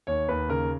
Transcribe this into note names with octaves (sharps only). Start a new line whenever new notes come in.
D#2 C#5
D#2 B4
C#3 A#4